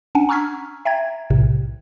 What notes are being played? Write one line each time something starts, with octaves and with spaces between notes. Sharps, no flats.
C#4 D4 F#5 G#5
A#5 C#6 E6 F6 G#6 B6
E5 G5 A#5 G#6
B1 A2 C3